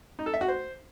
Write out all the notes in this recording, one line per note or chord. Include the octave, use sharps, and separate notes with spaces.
D#4
A4
E5
F#4
C5